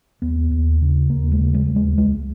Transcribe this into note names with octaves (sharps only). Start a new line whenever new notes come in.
D#2 B3
D#2
C#3
D#2 A#3
G#3
C#3
G#3
D#2
G#3
C#2 G#3